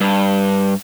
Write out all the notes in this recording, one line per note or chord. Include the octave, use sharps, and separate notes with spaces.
G2